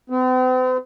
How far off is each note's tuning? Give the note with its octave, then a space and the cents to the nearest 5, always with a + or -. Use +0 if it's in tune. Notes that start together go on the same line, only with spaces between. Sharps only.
C4 -45